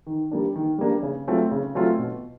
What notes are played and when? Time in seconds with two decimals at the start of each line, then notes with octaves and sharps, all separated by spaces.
0.07 D#3
0.31 G3 A#3 D4
0.55 D#3
0.79 G3 A#3 D4
1.03 C#3
1.27 F#3 A3 C4 F4
1.51 C#3
1.75 F#3 A3 C4 F4
1.99 B2